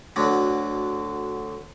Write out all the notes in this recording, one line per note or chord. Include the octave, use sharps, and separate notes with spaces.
D2 D3 F#3